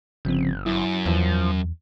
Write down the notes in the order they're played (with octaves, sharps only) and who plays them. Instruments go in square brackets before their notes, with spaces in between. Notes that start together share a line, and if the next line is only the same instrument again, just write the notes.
[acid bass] G1 [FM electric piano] C#3 F3 C4
[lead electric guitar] F#2 [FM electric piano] E4
[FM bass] E2 [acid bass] F3